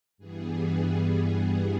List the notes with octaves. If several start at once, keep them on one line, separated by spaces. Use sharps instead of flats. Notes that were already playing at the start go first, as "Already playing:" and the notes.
G2 E3 G3 B3 G#4